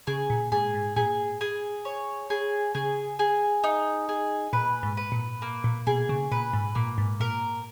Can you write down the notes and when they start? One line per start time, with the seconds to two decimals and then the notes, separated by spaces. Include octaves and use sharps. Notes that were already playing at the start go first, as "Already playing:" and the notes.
0.07 C#3 G#4
0.30 A#2
0.52 G#2 G#4
0.74 G#2
0.96 A#2 G#4
1.41 G#4
1.85 C#5
2.30 G#4
2.75 C#3 G#4
3.19 G#4
3.64 D#4
4.09 G#4
4.53 A#2 B4
4.83 G#2
4.97 B4
5.12 A#2
5.42 A#3
5.64 A#2
5.87 B2 G#4
6.09 C#3
6.32 A#2 B4
6.53 G#2
6.75 A#2 A#3
6.98 G#2
7.20 A#2 A#4